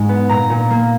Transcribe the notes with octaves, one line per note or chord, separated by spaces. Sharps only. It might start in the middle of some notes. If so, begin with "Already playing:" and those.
Already playing: G#2 G#3
B3
A#2 A#5
A#2
A#3